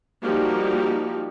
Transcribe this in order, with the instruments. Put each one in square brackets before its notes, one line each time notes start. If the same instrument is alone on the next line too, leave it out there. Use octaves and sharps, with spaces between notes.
[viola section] F3 G3 A#3 D#4 F#4 G4